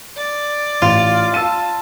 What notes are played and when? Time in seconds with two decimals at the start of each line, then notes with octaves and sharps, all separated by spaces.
0.17 D5
0.82 A1 F4
1.34 A5 E6 D#7